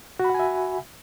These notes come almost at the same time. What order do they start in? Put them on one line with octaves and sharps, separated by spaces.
F#4 B5 F#5 G#5 E5